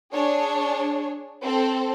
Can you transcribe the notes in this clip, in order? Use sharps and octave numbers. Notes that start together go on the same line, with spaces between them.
D4 G#4 C#5
C4 A4